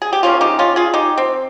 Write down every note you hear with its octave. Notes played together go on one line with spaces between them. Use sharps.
G#4
G4
C#3 F3 A#3 C#4 F4
D#4 G4
C#4 F4
F4 G#4
D#4 G4
C4